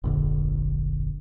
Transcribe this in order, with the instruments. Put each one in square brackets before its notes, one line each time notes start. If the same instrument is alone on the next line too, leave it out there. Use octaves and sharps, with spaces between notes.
[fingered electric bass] F1 A#1 D3